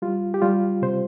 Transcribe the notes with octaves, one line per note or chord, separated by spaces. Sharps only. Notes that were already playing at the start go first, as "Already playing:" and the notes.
G3 F4
G4
G3 F4
C3 C5